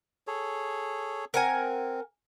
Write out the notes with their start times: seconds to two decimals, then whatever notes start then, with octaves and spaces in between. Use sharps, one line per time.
0.27 G#4 A4 C#5
1.34 C4 A#4 F#5 G#5